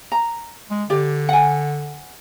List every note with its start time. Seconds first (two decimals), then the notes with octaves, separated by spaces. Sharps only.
0.12 A#5
0.70 G#3
0.90 D3 G4 D5
1.29 F#5 G#5